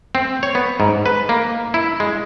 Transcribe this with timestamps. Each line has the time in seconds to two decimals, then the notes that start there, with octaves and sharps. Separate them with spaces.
0.15 C4
0.43 C#5
0.55 B3
0.80 G#2
1.06 B4
1.29 A#3
1.74 E4
2.00 G#3